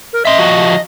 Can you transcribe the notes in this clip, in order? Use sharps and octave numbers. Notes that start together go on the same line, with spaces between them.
A#4
D#5 E5 C6
F3 F#4